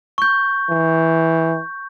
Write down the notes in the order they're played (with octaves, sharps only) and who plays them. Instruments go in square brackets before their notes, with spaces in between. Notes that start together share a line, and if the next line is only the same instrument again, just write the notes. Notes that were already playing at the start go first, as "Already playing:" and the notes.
[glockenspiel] C#6 G6
[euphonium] E3